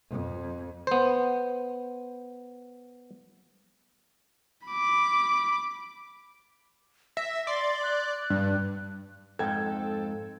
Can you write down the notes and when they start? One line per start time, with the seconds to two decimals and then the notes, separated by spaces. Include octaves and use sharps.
0.10 F2
0.87 B3 C5
4.67 B5 D6
7.17 E5 A#6
7.47 D5 C6
7.83 F#6
8.30 G2
9.39 F2 G#2 A4 G5 G#6